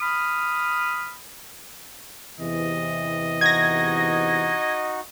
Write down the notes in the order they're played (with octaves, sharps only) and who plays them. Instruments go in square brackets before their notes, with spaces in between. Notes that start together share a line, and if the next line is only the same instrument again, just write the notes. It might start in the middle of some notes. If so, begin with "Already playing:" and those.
[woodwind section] B5 D#6 F6
[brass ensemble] E2 C3 E3 [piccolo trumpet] D#5
[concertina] D#4 F#4 [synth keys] G#6 A#6